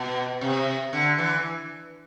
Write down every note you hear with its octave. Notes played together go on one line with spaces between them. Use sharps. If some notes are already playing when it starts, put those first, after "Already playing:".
Already playing: B2
C3
D3
E3